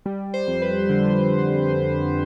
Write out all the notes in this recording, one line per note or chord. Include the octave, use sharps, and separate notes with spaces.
G3
C5
F2
B4
D3